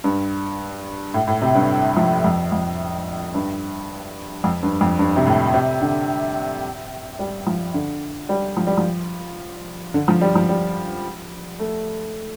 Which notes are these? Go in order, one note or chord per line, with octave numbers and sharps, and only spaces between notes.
G2
A2
A2
C3
G2
F3
F2
F2
G2
F2
G2
F2
G2
C3
A2
C3
D3
G3
F3
D3
G3
F3
G3
F3
D3
F3
G3
F3
G3
A3